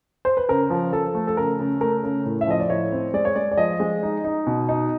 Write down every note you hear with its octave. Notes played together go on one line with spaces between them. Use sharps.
C5
B4
C#3 A#4
F3
F3 A4
A3
A4
C#3 A#4
C#3
A3 A#4
C#3
A2
E5
F3 D#5
D5
A2 C#5
C4
G#3 D5
C#5
G#3 D5
D5
F3 D#5
G#3
D#4
D#4
B2
D#4